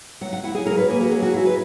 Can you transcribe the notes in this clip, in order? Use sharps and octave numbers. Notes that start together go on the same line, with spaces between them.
F#3 F#5
F#5
E4 F#5
G#4
F#3 A#4
B4
A#3 G#4
F#4
F#3 G#4
F#4
E4 G#4
B4